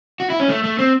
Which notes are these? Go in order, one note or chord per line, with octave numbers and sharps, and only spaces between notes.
F#4
E4
C#4
A3
A3
C4